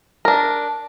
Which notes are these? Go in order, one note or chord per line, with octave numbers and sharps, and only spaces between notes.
D4 A#4